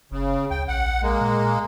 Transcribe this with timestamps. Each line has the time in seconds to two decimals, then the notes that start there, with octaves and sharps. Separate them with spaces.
0.11 F#1 C#3
0.51 D2 G5
0.68 A#1 F#5
1.03 G#3 A#3
1.21 A#2